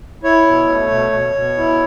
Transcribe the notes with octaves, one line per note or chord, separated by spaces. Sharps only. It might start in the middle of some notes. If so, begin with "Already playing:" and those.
E4 C#5
B2
A3
B2
B2
B2
E4